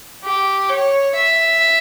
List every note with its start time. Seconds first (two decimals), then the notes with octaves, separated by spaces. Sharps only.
0.25 G4
0.70 C#5
1.16 E5